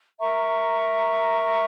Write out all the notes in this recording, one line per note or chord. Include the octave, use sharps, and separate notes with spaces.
A#4 E5 A#5 C#6